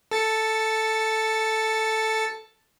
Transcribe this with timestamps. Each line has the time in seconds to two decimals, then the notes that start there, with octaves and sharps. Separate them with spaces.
0.11 A4 A6 C#7